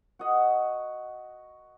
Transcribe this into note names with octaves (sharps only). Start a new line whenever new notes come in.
F#4 D#5 F#5